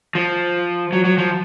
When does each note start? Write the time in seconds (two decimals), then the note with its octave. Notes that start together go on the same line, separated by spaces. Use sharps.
0.15 F3
0.93 F#3
1.05 F#3
1.18 F3